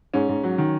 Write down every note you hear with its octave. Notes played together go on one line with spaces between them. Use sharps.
G#2 C#4
G#2
F#3
D#3